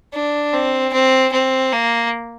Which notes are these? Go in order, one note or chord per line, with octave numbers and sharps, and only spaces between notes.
D4
C4
C4
C4
A#3